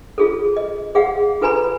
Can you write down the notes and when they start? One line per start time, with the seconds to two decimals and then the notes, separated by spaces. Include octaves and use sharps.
0.18 F4 G#4 A4
0.57 D#5
0.95 G#4 F5 F#5
1.41 F4 A4 B4 G#5 A#5 B5